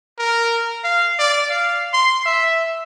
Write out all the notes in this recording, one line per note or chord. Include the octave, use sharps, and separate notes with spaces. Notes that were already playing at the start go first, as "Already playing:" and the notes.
A#4
F5
D5
F5
C6
E5